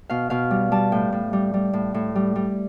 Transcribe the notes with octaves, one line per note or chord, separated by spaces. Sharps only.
B2 F5
B2 F5
G3
G3 A5
A2 G5
A2
G3
G3
A2
A2
G3
G3